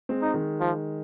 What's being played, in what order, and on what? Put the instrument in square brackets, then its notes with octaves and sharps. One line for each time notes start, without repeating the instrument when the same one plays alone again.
[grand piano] G#3 C4
[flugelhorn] D#4
[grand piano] D#3 G#3
[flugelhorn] F3